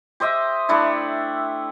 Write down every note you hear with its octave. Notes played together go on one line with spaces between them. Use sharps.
G4 C5 D#5 E5
A3 D4 E4